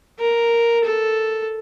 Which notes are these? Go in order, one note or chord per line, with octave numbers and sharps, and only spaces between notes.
A#4
A4